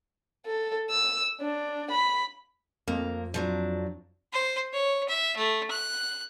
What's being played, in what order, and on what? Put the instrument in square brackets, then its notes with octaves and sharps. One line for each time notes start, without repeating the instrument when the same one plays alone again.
[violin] A4
E6
D4
B5
[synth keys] F2 [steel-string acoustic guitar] A#3
[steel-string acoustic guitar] F3 F#3 D4
[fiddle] C5
C#5
E5
A3
F#6